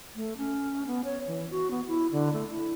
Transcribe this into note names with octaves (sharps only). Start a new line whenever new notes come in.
A3
C#4
B3
C#5
E3
F#4
B3
E4
D3
A3
E4